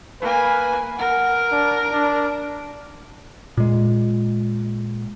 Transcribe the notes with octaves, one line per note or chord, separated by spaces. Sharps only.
A#3 B4 G#5
A#4 F#5
D4
D4
A#2 G#3